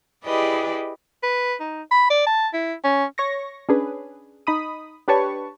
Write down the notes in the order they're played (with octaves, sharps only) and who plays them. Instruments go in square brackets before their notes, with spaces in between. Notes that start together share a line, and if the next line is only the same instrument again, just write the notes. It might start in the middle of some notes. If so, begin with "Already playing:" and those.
[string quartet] E4 G4 G#4 B4 D5 D#5
[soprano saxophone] B4
D#4
B5
D5
A5
E4
C#4
[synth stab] C#5 C#6 A#6
C#4 D4 G#4 B4
D#4 B5 D#6
D4 G4 B4 C#5 A5 C#6